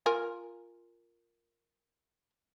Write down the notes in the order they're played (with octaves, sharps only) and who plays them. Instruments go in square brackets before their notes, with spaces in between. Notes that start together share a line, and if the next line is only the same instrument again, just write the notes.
[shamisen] F4 A#4 G#5